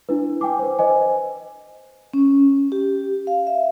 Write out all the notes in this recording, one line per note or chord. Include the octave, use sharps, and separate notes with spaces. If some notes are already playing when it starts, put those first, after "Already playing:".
D4 E4 B4
G5 G#5 D6
B4 C5
B4 C5 D#5 G#5
C#4
G4
F5
E5